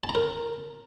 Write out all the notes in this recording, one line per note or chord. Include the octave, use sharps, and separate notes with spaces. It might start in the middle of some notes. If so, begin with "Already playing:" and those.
A5
A#5
A#4